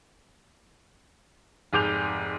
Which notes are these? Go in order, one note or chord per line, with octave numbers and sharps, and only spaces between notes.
F1 G#2 G#4 D6 G6 F7